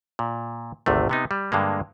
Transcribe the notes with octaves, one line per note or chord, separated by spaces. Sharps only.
A#2
G#1 D2 C3 A3
C3 B3 D#4
G3
G2 D3 G#3 A#3